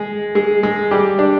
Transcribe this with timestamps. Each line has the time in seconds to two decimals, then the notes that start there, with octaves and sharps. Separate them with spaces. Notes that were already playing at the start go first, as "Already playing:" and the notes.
Already playing: G#3 G#4
0.35 G#3 G#4
0.63 G#3 G#4
0.91 G3 G4
1.19 D4